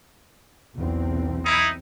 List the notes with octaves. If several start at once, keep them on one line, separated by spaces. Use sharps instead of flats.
B1 E2 C4
D#4 E4